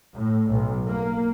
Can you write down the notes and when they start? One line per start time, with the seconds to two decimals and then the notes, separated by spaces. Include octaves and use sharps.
0.15 A2
0.52 B1
0.88 A#3